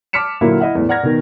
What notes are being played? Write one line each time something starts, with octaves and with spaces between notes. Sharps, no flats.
A5 D6 F6 B6 C#7 E7
A#2 D3 F#3 A#3 E4
E4 D#5 E5 F#5
E2 A2
D5 F#5 A#5 F6 G#6 A#6
B2 D#3